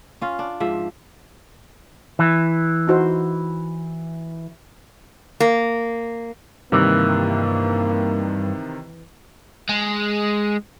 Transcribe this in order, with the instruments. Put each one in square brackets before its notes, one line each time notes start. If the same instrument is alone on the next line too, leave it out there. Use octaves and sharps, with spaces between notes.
[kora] C#4 F4
D4
G#2 F3 E5
[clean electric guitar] E3
[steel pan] D#4 F#4 C5
[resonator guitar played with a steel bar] A#3
[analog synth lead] G2 [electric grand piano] C3 D#3 [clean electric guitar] E3 [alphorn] A#3
[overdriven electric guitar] G#3